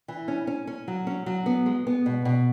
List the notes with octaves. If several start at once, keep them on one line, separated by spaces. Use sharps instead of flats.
E3
C#4
C#4
C#4
F#3
C#4
F#3
B3
G#3
B3
B2
B2